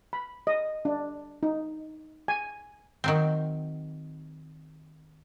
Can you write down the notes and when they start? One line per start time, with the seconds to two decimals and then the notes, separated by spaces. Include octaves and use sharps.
0.13 B5
0.47 D#5
0.85 D4
1.43 D#4
2.28 G#5
3.04 D#3 F#3 C4